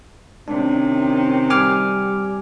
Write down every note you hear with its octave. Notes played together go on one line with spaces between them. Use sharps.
C3 D#3 C#4 D4
G3 G#5 D6 F6